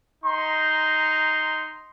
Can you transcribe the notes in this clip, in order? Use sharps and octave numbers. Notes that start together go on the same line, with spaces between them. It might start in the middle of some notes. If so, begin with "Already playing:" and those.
D#4 A#5 C6